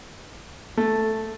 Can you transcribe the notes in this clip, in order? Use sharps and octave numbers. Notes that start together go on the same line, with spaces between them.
A3